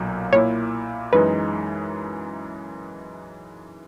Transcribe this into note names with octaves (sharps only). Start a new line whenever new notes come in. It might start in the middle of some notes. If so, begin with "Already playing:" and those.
Already playing: B1 A#2 F#3 A#3
A#2 A#3 E4 C#5
F#2 E3 G#3 D#4 B4